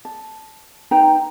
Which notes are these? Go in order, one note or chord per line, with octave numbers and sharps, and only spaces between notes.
A5
D#4 B4 G5 A#5